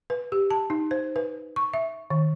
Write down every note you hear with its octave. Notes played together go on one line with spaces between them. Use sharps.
B4
G4
A5
D#4
C5
B4
C#6
E5
D#3